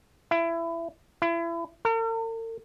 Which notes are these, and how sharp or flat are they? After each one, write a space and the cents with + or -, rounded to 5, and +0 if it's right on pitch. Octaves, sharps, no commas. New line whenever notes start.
E4 +25
E4 +35
A#4 -45